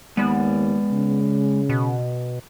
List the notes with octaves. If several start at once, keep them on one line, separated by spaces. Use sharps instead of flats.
D#2 G#3 B3 D5
C#3
B2